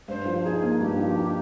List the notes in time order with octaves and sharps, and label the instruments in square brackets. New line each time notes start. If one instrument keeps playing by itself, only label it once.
[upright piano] G2 [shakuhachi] C5
[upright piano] F3
[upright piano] D#4 [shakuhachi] G#4
[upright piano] A#3
[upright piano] G2 [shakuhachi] G4
[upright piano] F3
D#4